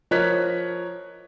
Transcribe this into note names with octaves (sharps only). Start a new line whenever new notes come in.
F3 A#4 C#5 D#5 F#6 B6